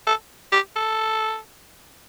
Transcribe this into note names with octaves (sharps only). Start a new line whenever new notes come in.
A4
G4
A4